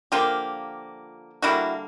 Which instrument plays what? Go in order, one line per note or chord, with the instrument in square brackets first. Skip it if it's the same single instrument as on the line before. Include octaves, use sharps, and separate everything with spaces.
[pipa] D3 F3 A#3 F4 G4
D3 G3 A#3 E4 F#4